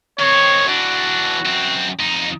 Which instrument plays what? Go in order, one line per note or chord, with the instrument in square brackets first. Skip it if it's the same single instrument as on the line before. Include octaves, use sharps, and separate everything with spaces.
[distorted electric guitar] D#3 C4 [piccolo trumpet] C#5
[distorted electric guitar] E3 D4 [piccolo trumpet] F#4
[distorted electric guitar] F#2 C4
F2 D#4